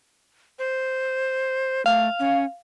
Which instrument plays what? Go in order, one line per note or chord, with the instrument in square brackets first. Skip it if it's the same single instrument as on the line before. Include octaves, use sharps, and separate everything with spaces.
[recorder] C5
[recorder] A3 [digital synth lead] F5
[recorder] C#4